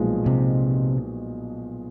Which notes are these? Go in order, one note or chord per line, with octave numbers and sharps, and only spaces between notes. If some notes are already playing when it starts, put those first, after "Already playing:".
Already playing: B1 A#2 F3 G#3
C3